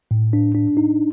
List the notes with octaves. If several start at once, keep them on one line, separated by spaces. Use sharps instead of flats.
A2
D4
D4
D#4